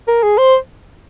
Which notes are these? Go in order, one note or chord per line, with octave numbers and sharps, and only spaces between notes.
A#4
G#4
C5